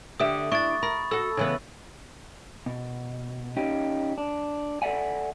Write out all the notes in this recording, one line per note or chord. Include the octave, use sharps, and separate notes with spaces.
D3 G4 E5 D#6
D4 E4 C#6 A6
A#4 B5
F#4 A4 E6
C#3 E3 B3
B2
C#4 D#4 G4
D4
A4 D5 E5 F#5 G#5